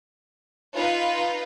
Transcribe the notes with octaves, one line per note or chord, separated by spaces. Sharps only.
D#4 F4 B4